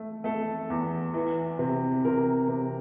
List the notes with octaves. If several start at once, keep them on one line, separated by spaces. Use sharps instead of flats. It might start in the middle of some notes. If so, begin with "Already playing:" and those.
Already playing: A3
A3 A4
E2
E3
C3
C3 A#4
C3